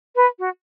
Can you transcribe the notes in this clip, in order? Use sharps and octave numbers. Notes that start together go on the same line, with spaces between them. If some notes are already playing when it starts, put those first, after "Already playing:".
B4
F#4